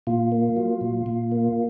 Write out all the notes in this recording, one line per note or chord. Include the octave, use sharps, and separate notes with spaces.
A#2 F4
A#3
F#3
A#2
A#2
A#3